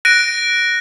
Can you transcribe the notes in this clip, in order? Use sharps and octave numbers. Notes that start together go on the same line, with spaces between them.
F#6 A#6 D7 D#7